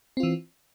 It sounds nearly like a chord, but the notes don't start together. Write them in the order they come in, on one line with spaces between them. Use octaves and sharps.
C4 F4 E3